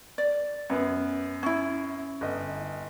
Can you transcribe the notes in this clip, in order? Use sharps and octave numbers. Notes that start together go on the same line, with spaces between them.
D5
F#2 B3
C#4 E4
G1 D#5